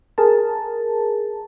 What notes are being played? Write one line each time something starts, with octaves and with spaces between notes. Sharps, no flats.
G#4 A#4 A5